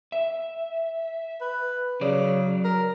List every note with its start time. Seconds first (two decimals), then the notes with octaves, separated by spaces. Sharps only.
0.12 E5
1.41 B4
2.01 C#3 F#3 D5
2.64 A#4